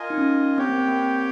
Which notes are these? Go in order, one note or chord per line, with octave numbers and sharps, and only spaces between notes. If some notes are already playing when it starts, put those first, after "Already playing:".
Already playing: F4 A#4 D#5 G#5
D#4
C#4
C4 G4 C#5 G5
A#3
C4
A#3
C4